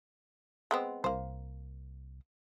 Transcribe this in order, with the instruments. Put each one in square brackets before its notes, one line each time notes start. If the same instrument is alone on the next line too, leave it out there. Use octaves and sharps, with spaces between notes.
[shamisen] G#3 B3 C4
[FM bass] C2 [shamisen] A#3 C5